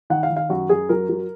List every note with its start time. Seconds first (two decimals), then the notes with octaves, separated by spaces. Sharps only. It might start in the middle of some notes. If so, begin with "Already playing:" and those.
0.10 D#3 F#5
0.23 F5
0.30 D#3
0.36 F5
0.50 F#2 F#4
0.69 F#2 G#4
0.89 F#3 A#4
1.09 F#3